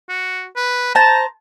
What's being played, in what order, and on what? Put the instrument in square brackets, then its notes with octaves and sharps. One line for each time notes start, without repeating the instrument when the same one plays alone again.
[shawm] F#4
B4
[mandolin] C5 A5 [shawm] A#5